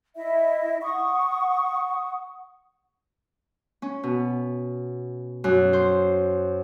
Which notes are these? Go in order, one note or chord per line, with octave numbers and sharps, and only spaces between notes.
E4 D#5 E5
F#5 C#6 D#6
C#4
B2
F#2
C5